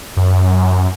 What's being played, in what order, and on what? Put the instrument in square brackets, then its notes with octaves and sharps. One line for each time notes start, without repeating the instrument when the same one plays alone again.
[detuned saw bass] F#2